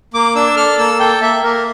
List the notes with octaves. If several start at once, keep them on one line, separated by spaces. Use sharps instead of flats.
A#3 D6
D4 E6
A4 F6
A#3 E6
A4 G5
A#3 E5
A#3 A#4